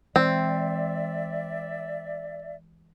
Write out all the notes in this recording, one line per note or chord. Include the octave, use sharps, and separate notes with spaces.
E3 G#3 C4 D5 E5